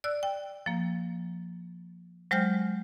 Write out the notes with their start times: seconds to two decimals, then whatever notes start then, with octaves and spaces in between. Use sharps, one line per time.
0.04 D5 E6 F#6
0.23 G5
0.66 F3 A#3
2.31 F#3 G#3 C5 G5 F6 G6